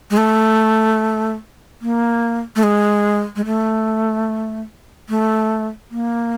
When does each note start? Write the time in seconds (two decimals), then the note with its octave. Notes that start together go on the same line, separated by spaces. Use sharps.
0.11 G#3
0.17 A3
1.82 A#3
2.56 A3
2.63 G#3
3.36 G#3
3.45 A3
5.09 A3
5.91 A#3